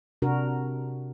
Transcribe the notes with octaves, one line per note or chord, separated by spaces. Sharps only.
C3 D4 F#4 A#4